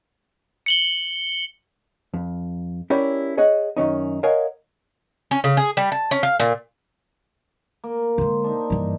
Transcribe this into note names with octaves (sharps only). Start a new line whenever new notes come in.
C#7 F#7 G7
F2
C#4 E4 G4 A#4 C#5 D5
G#4 C#5 D#5 F#5
F#2 D#3 C#4 D#4
A#4 C#5 D#5 F5 F#5 G#5
C#4
C#3
G#4
G3
A5
C#4
F5
A#2
A#3
D3 G#3 C5
D4 D#4
G2 E3